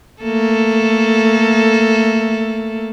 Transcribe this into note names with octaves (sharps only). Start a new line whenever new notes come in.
A3 A#3 A4